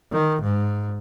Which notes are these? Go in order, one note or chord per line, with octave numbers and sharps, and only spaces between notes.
D#3
G#2